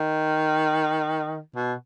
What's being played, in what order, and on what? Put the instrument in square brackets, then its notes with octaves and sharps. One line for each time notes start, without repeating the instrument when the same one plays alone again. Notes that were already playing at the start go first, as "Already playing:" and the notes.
Already playing: [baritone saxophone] D#3
B2